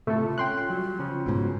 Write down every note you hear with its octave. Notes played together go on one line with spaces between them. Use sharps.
C#2 A2 C3 A3 F4 A4
C#4 G5 C6 F#6
F#3 G3
C#3 F3 C#4
G#2 B2 F#4